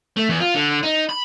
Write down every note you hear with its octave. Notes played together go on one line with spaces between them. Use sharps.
A3
E2
F4
D3
D#4
B5